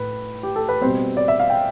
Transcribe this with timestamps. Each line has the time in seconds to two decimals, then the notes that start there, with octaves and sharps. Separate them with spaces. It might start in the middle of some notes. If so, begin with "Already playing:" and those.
Already playing: A2 B4
0.43 G4
0.56 A4
0.69 B4
0.81 B2 G3 C4 C5
1.17 D5
1.28 E5
1.40 F5
1.50 G5